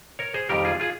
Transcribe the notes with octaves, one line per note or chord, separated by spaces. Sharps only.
A#4 C#5
G#4 C5
F2 D#3 G3 G4 A#4
F4 G#4
F4 G#4